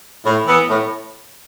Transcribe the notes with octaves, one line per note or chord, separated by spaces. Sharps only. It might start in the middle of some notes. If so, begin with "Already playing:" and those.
A2
E3 B3
A2